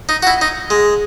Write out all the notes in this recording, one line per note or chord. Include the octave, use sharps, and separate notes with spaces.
D#4
F#4
E4
D#4
G#3